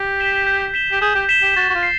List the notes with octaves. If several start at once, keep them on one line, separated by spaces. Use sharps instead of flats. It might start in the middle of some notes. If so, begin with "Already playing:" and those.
Already playing: G4
B6 E7 G7
G6
B6 E7 G7
G4
G#4 G6
G4
B6 E7 G7
G4
F#4 A6
F#4
F4
C7